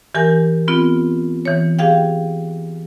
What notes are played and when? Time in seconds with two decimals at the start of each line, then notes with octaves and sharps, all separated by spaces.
0.15 E3 G4 A#4 G#5
0.68 B3 C4 F4
1.45 E3 C#5
1.79 G4 G#4 F5 G5